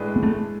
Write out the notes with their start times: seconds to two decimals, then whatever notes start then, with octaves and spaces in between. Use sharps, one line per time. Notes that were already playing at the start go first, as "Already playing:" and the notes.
Already playing: A2 G#3 D4 G#4 B4
0.16 B3
0.23 A3